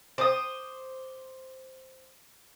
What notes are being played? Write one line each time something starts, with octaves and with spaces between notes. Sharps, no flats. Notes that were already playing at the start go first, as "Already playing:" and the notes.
C5 D6 D#6